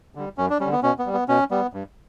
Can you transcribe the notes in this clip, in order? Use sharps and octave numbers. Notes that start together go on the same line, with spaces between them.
D3 G3
F#2 C#4
D4
D3 G3 C#4
B3
B2 C#4
B3
G3
B3
B2 C#4
G3 B3
G2